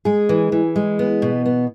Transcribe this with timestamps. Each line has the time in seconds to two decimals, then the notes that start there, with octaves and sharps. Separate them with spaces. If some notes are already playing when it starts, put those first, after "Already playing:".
0.05 G#3 G#4
0.29 E3
0.52 E3
0.76 G#3
0.99 B3
1.22 B2
1.46 B3